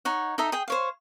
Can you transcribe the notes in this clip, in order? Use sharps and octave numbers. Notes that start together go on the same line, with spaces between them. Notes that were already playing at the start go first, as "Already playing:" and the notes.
D#4 C#5 F#5
D#4 A4 D#5 E5
G#4 G5
C5 C#5 F5